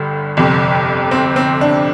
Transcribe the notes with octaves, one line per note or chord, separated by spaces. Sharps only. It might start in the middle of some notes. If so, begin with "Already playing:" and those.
Already playing: G1 G2 D3 G4
G1 F2 C3
C4
C4
D4